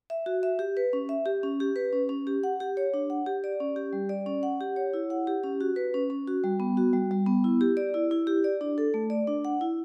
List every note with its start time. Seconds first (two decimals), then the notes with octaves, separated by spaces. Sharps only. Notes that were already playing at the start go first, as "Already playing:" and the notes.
0.10 E5
0.26 F#4
0.43 E5
0.59 G4
0.77 B4
0.93 C#4
1.09 E5
1.26 G4
1.43 C#4
1.60 G4
1.76 B4
1.93 C#4
2.09 C#4
2.27 G4
2.44 F#5
2.60 G4
2.77 C#5
2.94 D4
3.10 F#5
3.26 G4
3.44 D5
3.60 C#4
3.76 G4
3.93 G3
4.09 D5
4.26 C#4
4.43 F#5
4.61 G4
4.76 C#5
4.93 E4
5.10 F#5
5.27 G4
5.43 C#4
5.60 F#4
5.76 B4
5.94 C#4
6.10 C#4
6.27 F#4
6.44 G3
6.60 B3
6.77 F#4
6.93 G3
7.11 G3
7.26 B3
7.44 E4
7.61 G4
7.77 D5
7.94 E4
8.11 E4
8.27 G4
8.44 D5
8.61 D4
8.78 A4
8.94 A3
9.10 D5
9.27 D4
9.45 F#5
9.61 E4